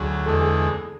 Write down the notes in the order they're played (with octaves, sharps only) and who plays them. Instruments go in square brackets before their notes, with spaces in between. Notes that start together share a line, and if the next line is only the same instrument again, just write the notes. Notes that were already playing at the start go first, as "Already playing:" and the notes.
Already playing: [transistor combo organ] D2 F#3 [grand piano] G#4
[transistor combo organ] E2 D3 G#3 [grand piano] A4
[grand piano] G#4